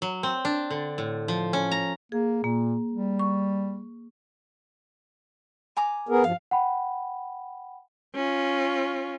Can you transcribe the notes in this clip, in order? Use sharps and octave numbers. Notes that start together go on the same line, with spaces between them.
F#3
C4
D4
D3
A2
F3
C#4
A#5
A#3 G#4
A#2 A#3
G3
C#6
G#5 A#5 D6
B3 G#4 A#4
G2 F3 F5
F#5 G5 B5
C#4 F4